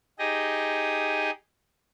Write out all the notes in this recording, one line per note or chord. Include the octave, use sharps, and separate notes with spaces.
D#4 G4 G#4 D#5